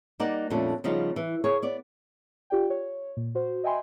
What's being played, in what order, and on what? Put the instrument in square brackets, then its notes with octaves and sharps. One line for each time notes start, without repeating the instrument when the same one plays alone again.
[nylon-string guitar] G3 A#3 D#4 D5 F#5
F2 A#2 D3 G3 A3 C#4
C#3 F3 G3 B3 D#4
E3
G#4 A#4 C#5
B3 D5
[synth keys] F4 G4 D5 G5
C#5
A#2
F#4 C5
D#5 E5 G5 G#5 B5 C6